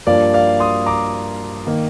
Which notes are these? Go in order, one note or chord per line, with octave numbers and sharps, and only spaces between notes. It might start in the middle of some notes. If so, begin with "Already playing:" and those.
G2 F3 A#3 D5 F5
D5 F5
C6 D#6
A#5 D6
D#3 A#3